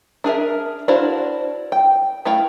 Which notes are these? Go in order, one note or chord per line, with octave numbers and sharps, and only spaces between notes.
D4 G#4 A#4 E5
D4 E4 F#4 C5 F5
G5
A3 E4 D#5 F5 G5